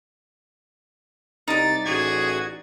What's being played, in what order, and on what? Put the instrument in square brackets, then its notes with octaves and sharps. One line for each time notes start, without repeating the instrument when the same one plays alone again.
[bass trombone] C2 [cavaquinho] D#4 D5 [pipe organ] A6
[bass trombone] A1 [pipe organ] F#4 G#6 [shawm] G#4